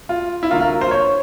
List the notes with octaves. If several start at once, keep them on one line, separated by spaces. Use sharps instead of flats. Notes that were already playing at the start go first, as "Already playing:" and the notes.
F4
E4
D3 F#3 A#3 F4
F4
C5
C#5